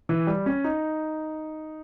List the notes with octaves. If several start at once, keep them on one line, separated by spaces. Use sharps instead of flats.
E3
G3
C#4
D#4